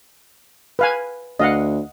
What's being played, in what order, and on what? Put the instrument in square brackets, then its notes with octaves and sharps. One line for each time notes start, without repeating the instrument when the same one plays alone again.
[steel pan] B4 F5 G#5
[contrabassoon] D2 [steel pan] D#5 F5 F#5